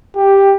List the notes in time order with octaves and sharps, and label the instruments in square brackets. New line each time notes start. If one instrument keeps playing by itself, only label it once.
[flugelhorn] G4